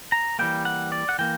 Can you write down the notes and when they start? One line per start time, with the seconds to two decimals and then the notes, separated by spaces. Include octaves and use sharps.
0.12 A#5
0.39 E3 G3 A#3 G5
0.65 F#5
0.92 D5
1.09 F#5
1.19 E3 A#3 G5